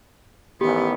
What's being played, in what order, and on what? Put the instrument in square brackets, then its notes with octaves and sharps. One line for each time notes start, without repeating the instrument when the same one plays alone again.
[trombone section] A1 D#3 E3 [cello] B3 [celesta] G4